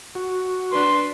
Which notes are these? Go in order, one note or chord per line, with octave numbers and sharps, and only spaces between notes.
F#4
D4 B4 C6